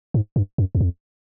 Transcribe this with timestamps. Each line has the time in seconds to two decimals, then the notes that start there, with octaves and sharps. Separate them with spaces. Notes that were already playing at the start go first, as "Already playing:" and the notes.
0.14 G#2
0.36 G2
0.58 F#2
0.75 E2
0.81 F2